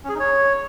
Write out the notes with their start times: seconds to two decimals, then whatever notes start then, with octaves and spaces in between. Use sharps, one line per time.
0.04 C#4
0.09 G#4
0.14 D#4
0.19 C#5